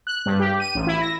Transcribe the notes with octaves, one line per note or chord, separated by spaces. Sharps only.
F#6
G2
G4
D#7
A1
E4
A#6